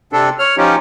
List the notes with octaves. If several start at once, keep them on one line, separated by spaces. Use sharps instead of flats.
C3 C4 D4 A4
C#5 F6
F3 C#4 D#4 F4 G4